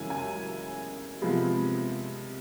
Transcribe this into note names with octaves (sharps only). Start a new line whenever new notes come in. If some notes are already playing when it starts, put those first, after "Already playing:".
Already playing: F#2 C#3 E3 G#3 G#5
G#5
C3 F3 G#3 B3